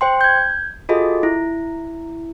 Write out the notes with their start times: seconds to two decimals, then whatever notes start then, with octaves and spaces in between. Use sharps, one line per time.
0.01 C5 G5 C6
0.21 G6 G#6
0.89 F4 F#4 G#4 A4 D#5
1.23 E4